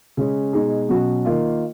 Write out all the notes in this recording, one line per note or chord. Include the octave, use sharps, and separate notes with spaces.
C#3 G#3 C#4
B2 G#3 D#4 G#4
B2 F#3 C#4 F#4
D#3 A#3 F4